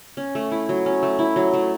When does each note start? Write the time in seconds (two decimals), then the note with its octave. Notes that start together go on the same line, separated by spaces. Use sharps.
0.17 C#4
0.35 A3
0.51 E4
0.69 F#3
0.86 C#4
1.03 A3
1.19 E4
1.36 F#3
1.53 A3